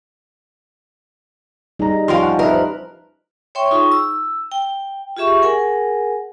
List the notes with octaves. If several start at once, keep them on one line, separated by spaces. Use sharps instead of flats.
G3 D#4 G#4 A#5
F3 C#4 A#4 F5 G5 C6
F#5
D#4 A#4 B4 D#5 E5
C5
C#5 E5 G5 C6 C#6
D#4 F4 G#4 C#6
E6
G5
F4 G4 G#4 E5 C#6
G#4 A#4 F#5 G#5